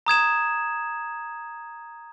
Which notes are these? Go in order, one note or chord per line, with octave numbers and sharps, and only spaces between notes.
A#5 D#6 G#6 E7